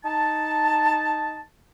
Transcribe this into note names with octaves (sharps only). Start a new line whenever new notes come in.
D#4 A5